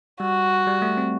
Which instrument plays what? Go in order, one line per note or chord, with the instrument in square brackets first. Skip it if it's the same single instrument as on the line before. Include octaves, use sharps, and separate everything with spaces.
[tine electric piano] G3 [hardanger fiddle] F#4
[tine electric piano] G3
A3
C4